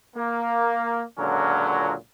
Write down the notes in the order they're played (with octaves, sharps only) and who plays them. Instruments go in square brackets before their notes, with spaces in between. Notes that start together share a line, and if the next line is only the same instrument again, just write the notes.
[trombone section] A#3
C#2 A#2 D3 F#3 C#4 A#4